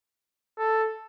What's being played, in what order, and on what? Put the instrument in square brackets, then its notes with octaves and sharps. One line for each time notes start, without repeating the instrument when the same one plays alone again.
[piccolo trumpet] A4